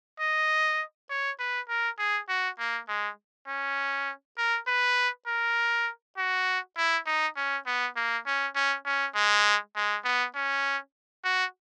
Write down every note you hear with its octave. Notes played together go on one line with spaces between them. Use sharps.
D#5
C#5
B4
A#4
G#4
F#4
A#3
G#3
C#4
A#4
B4
A#4
F#4
E4
D#4
C#4
B3
A#3
C#4
C#4
C#4
G#3
G#3
B3
C#4
F#4